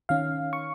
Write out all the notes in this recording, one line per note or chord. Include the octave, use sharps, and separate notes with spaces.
D#3 C#4 F5
C#6